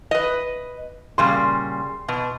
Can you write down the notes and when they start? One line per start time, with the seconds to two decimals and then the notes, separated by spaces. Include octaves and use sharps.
0.11 B4 D#5
1.18 A#2 C#3 G3 C6
2.08 B2